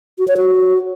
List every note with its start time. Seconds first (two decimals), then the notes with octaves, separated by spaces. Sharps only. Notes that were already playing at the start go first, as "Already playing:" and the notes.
0.19 F#4
0.28 C#5
0.37 F#4